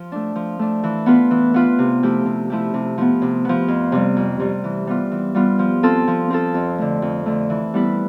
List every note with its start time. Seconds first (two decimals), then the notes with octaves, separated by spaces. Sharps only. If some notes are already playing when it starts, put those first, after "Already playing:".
Already playing: F3
0.12 A3 D4
0.35 F3
0.59 A3 D4
0.84 E3
1.06 B3 F4 B4
1.31 E3
1.54 B3 F4 B4
1.79 C3
2.03 F3 A3 E4 G4
2.26 C3
2.50 F3 A3 E4 G4
2.74 C3
2.98 F3 B3
3.22 C3
3.45 F3 B3
3.68 F2
3.92 C3 G3
4.17 F2
4.40 C3 G3
4.64 E3
4.87 G3 B3 F4
5.12 E3
5.35 G3 B3 F4
5.59 F3
5.83 C4 F4 A4
6.07 F3
6.30 C4 F4 A4
6.54 F2
6.78 D3 A3
7.02 F2
7.26 D3 A3
7.50 E3
7.74 G3 B3 E4 B4